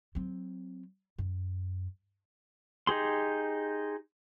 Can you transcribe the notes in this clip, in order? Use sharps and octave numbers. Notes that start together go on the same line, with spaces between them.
F#3 C4
F#2
D#4 G4 G#4 C6